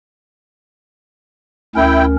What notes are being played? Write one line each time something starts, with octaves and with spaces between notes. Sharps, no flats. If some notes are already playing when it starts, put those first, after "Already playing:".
D2 C#4 E4 A#4 G5